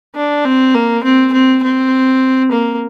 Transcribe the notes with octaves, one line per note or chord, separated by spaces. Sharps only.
D4
C4
A#3
C4
C4
C4
A#3